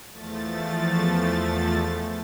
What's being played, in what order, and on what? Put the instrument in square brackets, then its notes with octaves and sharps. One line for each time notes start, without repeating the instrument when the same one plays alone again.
[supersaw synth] E2 F3 A3 A6